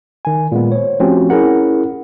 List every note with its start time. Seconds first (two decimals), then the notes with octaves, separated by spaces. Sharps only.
0.25 D#3 G#5
0.52 A#2 G#3 B3
0.72 C5 C#5
1.00 F3 A3 C4 C#4 F#4 G4
1.30 C#4 E4 G#4 A#4 F#5